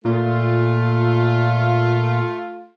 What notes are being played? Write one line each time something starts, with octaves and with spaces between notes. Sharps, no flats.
A#2 A3 F4